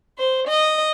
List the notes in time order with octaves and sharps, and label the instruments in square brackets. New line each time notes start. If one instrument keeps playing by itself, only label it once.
[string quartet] C5
D#5